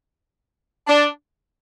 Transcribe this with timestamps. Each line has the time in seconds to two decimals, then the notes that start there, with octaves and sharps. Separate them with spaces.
0.87 D4